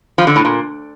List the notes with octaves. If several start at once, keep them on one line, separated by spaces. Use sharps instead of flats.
F3
D3
A2
A#2